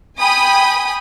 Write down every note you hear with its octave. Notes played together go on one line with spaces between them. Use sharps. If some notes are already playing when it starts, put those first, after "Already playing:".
G5 G#5 B5 D#6